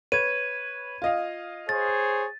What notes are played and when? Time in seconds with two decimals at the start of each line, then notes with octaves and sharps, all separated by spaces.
0.12 B4 C#5 G#6 D#7
1.02 F4 D#5 F5
1.69 G#4 C5 C#5 A6